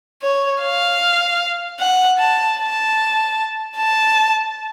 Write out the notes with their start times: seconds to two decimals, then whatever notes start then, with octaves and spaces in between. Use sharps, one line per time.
0.22 C#5
0.62 F5
1.80 F#5
2.19 A5
2.59 A5
3.77 A5